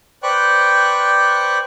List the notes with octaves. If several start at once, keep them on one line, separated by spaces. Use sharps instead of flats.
B4 C5 D5 G5 C#6 F#6